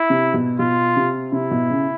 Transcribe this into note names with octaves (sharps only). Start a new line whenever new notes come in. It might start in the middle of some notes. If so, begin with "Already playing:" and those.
Already playing: E4
C3
B2
B2 F4
C3
C3 E4
B2
C#3